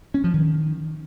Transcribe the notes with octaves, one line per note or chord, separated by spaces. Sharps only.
C#4
F3
D#3